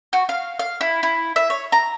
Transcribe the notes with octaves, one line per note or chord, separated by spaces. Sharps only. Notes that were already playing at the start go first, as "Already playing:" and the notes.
F#4
F5
F5
E4
E4
E5
C#5
A#5